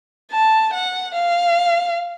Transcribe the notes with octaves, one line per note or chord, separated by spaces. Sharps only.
A5
F#5
F5